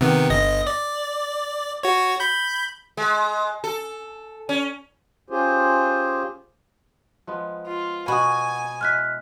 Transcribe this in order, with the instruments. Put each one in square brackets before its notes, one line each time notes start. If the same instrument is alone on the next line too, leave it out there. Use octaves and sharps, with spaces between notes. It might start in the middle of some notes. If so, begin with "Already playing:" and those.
[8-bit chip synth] C3 D#3 B3
G1 D#5 A#6
D5
F#4 C#5
B5 G6
[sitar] G#3
A4
C#4
[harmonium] C#4 F4 G4 G#4 C5
[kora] F3 G#3 B3
[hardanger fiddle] F4
[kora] B2 [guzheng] F#4 [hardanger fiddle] G#5 [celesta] B5 D#6
[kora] G#3 E4 [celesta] F6 F#6 B6